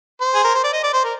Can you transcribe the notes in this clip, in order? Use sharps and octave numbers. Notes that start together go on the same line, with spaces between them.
C5
G#4
A#4
C5
D5
D#5
D5
C5
A#4